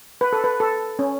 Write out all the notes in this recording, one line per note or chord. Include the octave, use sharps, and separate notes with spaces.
B4
A4
B4
A4
C#4